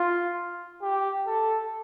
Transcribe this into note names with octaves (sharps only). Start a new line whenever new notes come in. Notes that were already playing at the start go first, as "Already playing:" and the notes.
Already playing: F4
G4
A4